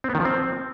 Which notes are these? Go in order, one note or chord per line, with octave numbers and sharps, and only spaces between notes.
C4
B3
D#3
F3
C4